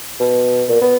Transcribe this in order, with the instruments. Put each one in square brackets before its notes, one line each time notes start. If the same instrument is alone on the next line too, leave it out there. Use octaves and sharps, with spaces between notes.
[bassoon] B2
A#2
B3